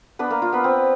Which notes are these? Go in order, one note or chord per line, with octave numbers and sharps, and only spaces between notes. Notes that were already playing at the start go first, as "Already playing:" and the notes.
B3 D4 B4
A#3 A#4
F4
B3 B4
C4